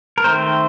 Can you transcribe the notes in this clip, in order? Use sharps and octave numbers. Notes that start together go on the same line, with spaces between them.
A#4
D#3 A3 C4 C5